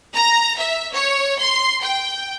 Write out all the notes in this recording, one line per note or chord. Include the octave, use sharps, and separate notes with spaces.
A#5
E5
C#5
C6
G5